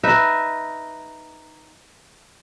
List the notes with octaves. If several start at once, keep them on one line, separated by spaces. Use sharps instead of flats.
D#4 B4 E5